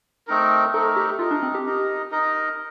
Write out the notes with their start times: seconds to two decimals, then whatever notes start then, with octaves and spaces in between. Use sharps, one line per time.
0.27 A3 C4 D#4 A#4
0.73 A3 C4 D#4 A4 A#4
0.97 G4
1.19 D#4 F4 A#4 D#5
1.31 D4
1.43 C4
1.55 G4
1.66 D#4 A#4 D#5
2.11 D#4 A#4 D#5